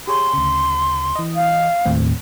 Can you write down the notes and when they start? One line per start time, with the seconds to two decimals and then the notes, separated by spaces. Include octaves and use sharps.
0.07 G4 G#4 C#5 C6
0.33 D2 C#3
1.16 E3 D#5
1.36 F5
1.85 D#2 A2 C4